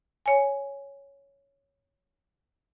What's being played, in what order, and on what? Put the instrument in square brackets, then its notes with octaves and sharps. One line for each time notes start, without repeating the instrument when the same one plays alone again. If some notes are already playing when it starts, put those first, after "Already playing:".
[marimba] C#5 G#5